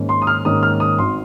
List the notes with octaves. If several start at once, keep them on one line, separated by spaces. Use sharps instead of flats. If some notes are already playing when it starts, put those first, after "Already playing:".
Already playing: G#2 D#3 A#3 C#4
C6
D#6
F6
G#2 D#3 A#3 C#4 D#6
F6
D#6
G#1 D#3 C6